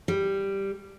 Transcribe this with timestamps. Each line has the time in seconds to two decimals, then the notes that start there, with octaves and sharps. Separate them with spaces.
0.08 G3